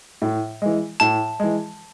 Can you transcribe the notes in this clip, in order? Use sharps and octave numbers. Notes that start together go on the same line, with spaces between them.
A2
E3 G#3
A2 A5
E3 G#3